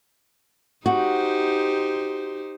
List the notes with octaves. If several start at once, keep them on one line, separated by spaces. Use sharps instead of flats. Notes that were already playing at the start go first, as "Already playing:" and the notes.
D#4 F#4 G4 C5